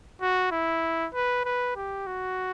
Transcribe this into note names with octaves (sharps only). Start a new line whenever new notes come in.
F#4
E4
B4
B4
G4
F#4